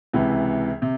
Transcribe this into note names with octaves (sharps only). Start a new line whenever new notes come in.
C#2 C3 E3
C3